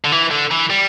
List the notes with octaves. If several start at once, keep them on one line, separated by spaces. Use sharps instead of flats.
D3
E3
D3
E3
G3